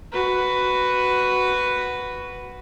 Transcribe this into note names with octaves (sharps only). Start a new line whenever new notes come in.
F#4 B4